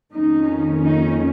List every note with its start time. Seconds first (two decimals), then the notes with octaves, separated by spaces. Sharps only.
0.13 F2 D#3 A#3 C#4 D#4
0.83 D#4